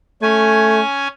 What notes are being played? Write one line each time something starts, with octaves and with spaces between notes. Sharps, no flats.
A3 C#4 G#5